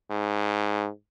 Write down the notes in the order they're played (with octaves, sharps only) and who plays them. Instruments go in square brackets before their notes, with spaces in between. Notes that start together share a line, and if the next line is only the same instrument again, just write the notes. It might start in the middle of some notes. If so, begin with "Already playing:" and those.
[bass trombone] G#2